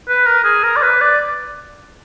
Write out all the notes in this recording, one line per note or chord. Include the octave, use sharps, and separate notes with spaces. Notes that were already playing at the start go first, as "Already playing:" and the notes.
B4
A#4
G#4
A#4
D5
B4
D5